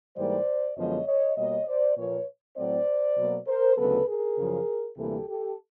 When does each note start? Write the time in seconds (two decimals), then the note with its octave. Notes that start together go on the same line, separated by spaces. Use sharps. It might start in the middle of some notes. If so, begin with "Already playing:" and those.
0.16 G#2 E3 G3 A#3 C5 D5
0.76 F#2 D3 F3 G#3 B3 C#5 D#5
1.07 C#5 D#5
1.36 B2 G3 A#3 C#5 D#5
1.67 C5 D5
1.96 A#2 F3 A#3 B4 C#5
2.56 A2 F#3 A3 C4 C5 D5
3.17 B2 F#3 A#3
3.47 A#4 C5
3.77 D2 C#3 F#3 B3 A4 B4
4.07 G#4 A#4
4.38 F#2 C#3 F3
4.97 D2 C3 E3 G3 A#3 G4 A4
5.27 G4 A4